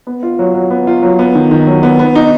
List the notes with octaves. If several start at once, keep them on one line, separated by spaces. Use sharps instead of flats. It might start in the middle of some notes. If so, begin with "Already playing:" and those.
B3
F4
F#3
F#3
B3
F4
F#3
B3
D#3
D#3
F#3
B3
B3
D#4